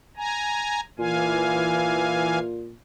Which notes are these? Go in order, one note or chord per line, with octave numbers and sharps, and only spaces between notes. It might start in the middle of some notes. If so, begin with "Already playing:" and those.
G#5 A#5
A#2 E3 F5 G#5